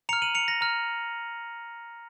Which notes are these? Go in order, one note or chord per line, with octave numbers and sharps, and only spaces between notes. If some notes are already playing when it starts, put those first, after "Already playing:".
A#5 F6 C#7 F7
D#7 F#7
C#7 F7
A#6
A#5 F6